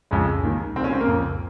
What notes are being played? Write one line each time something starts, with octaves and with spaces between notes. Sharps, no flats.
F2 C#3 G#3
D#2 D#3
C2 A#2 C4 C#4
C4
A#3
F2 C#3